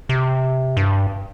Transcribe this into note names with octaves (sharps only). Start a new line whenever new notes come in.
C3
G2